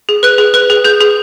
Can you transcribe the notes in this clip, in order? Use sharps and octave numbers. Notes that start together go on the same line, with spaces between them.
G#4
B4 F#6
G#4
B4 F#6
G#4
G#4 G6
G#4